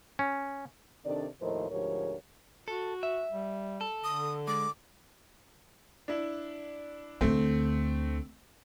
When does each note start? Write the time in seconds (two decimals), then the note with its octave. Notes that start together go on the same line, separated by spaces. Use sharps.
0.19 C#4
1.05 C3 D#3 D4 A4 D5
1.41 D#2 A2 F3 A#4 C5 D#5
1.70 D2 G#2 F3 G4 A#4 C#5
2.68 F#4 A4
3.03 E5
3.32 G3
3.81 A4
4.04 D3 D#6
4.48 G#3 D6
6.08 D4 E4
7.21 D2 D3 A3 C4